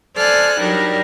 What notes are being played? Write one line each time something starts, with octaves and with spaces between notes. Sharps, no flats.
A4 C5 D5 G#5 F6 F#6
F#3 G3 D4 D#4 A#4